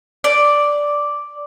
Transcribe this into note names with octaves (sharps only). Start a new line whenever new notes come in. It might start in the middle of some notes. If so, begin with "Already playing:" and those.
D5